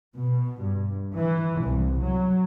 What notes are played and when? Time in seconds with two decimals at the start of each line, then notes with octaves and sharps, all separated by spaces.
0.15 B2
0.60 G2
1.17 E3
1.63 C2
2.03 F#3